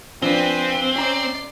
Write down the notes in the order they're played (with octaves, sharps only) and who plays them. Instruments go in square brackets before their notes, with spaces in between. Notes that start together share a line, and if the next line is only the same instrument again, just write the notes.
[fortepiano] F3 D4 [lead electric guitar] C4 [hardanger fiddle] B4 G#5
[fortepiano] C#4 A#5 [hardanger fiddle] D5 C6